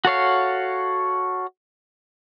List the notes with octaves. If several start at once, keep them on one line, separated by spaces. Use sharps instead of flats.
F#4 A4 C#5 F5